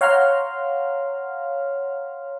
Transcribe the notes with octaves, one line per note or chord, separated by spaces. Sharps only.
C#5 F5 F#5 A#5 C6 F6